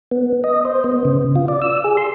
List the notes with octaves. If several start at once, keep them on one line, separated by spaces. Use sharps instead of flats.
B3
D#5
C5
B3
C#3
F4
D5
E6
G#4
C6